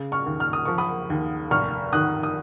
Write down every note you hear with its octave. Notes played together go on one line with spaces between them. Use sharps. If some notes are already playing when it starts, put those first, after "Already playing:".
Already playing: C#3
C#6 F6
D#2
F6
D#6
F3 C#6
B5 D#6
D#2
F1 C#6 F6
D#3 D#6 F#6
D#6